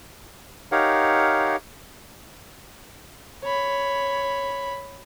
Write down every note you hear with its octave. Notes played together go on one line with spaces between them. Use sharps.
D#4 G4 A#4 C#5 F5 F#5
C#5 B5